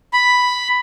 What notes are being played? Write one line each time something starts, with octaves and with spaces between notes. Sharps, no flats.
B5